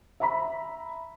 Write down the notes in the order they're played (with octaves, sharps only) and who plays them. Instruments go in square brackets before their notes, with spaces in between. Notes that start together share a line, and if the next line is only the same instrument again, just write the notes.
[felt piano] E5 A#5 B5